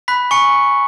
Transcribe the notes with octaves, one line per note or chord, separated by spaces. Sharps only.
B5 F#6 B6
G#5 C#6 C#7